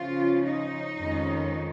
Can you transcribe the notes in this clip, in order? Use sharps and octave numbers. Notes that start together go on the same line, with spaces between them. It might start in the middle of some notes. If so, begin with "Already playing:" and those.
Already playing: C#3 F3 C#4 F4
D#4
F2 D#3 G#3 C#4